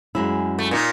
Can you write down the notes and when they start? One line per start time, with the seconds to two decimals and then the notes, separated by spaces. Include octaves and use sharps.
0.15 F#2 G#3 E4
0.59 A3
0.71 A#2 D#4